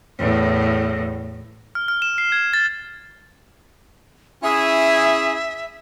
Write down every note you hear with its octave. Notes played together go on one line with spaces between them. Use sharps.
E2 A2
F6
F6
E7
C7
G#6
A6
C#4 E4 G#4 E5